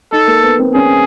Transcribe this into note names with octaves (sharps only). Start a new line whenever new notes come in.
D#4 A4
A#3
B3
C4
C#4 G#4